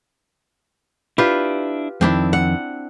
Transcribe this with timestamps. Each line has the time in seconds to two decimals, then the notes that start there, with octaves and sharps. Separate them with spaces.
1.18 D4 E4 F4 G4 B4
2.01 F2 D#3 C4 D4 E4
2.33 F#5